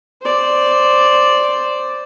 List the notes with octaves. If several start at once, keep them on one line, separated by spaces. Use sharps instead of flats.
C5 D5